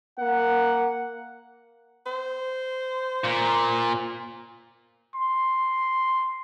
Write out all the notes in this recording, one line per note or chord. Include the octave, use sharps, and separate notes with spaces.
A#3 F#5
C5
A#2
C6